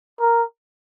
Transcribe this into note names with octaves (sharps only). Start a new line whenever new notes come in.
A#4